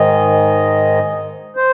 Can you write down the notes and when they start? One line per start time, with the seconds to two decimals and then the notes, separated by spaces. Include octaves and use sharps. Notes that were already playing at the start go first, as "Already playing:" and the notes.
Already playing: G#2 D#3 D#5
1.56 C5